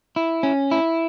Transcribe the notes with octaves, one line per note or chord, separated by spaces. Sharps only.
E4
C#4
E4